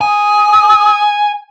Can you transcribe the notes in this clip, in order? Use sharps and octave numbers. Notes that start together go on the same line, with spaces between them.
G#5 D#6